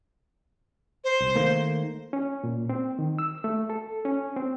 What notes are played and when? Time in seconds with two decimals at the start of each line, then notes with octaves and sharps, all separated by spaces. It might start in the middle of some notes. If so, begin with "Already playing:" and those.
1.04 C5
1.20 C2
1.35 D#3 A3 A#3
2.13 C#4
2.44 A#2
2.69 C4
2.99 D#3
3.19 E6
3.44 A3
3.70 A4
4.05 C#4
4.36 C4